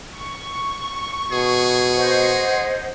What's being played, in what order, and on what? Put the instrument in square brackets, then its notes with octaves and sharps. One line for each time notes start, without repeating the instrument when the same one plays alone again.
[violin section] C#6
[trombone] B2 [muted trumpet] G#4
[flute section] C5 D#5 F#5